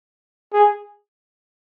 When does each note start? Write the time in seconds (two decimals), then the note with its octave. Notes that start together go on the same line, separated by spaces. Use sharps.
0.53 G#4